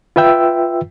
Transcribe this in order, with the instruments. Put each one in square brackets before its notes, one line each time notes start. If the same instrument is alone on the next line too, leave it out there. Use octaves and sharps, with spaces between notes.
[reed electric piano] F4 B4 E5 G5 E6